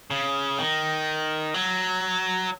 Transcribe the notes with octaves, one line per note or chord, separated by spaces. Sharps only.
C#3
D#3
F#3